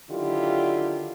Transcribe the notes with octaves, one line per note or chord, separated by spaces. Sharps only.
D3 D#3 F#3 E4 F4 G4